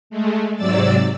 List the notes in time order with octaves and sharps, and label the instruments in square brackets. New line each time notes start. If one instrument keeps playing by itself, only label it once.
[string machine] G#3 A3
G#2 C3 F#3 D5 E6 A6